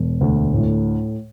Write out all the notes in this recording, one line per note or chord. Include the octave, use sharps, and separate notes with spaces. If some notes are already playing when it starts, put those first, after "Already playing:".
Already playing: E1
D2
A2